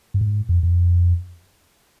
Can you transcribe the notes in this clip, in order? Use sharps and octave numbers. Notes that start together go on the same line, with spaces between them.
G2
G#2
F2
F2